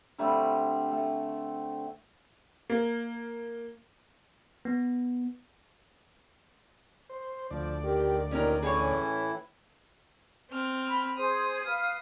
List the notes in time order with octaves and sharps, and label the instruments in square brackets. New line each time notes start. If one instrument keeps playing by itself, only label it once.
[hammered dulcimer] D3 G3 A3 C4
A3
[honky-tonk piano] A#3
[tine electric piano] B3
[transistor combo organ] C5
[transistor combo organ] D2 D5 [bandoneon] F3
[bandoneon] D#3 [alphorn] G4
[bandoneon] D#2 A#2 [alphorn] D#3 [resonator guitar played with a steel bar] C#4 A#4
[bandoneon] A2 E3 E4 [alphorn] C#4 [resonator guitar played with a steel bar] G#4 C#5
[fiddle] C4 F6
[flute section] B5
[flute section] G#4 C5 [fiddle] D#6
[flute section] B4 F5 F6